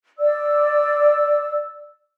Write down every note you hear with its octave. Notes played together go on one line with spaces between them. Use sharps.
D5 E6